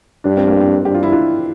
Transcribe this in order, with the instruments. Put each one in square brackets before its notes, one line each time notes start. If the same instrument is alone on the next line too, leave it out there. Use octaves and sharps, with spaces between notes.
[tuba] G2 [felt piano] D4
[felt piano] C4
A#3
C4
[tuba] G2 [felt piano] G4
[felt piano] F4
E4
D4 F4